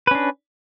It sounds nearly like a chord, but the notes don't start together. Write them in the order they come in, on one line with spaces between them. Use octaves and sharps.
B4 C#4 D4